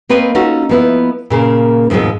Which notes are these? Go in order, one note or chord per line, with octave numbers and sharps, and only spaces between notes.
A#3 C4 B4 C#5 D#5
C#4 D#4 F4 F#4 A4
F3 B3 E4
A#2 C#3 A#3
D#2 G#2 B2 F3 G#3 C4